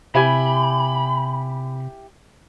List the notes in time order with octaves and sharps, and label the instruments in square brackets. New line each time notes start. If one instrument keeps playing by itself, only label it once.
[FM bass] C3 [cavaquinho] E4 G4 G#5 [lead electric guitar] B5